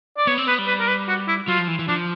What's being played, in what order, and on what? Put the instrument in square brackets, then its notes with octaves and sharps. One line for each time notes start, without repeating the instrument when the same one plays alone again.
[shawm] D5
[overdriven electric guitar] B3 [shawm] C#5
[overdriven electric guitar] C4
[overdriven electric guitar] B3 [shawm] B4
[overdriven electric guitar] G3
[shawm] B4
A#4
B4
F#4
E4
[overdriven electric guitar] F#3 [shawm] F4
[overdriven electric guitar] F3
E3
E3
[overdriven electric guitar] F3 [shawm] D4